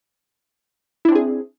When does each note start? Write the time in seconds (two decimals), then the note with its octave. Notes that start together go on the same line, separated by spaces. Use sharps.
1.05 E4
1.08 D4
1.12 C4
1.15 G#4